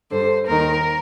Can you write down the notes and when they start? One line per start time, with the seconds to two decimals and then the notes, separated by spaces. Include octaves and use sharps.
0.11 G2 D3 C5
0.47 D#2 D#3 A#4